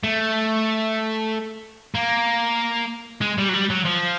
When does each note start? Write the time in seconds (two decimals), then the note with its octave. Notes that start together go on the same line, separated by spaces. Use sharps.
0.04 A3
1.95 A#3
3.21 G#3
3.38 G3
3.49 F#3
3.54 G3
3.70 F#3
3.85 F3